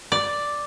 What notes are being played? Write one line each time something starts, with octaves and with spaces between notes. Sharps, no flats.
D5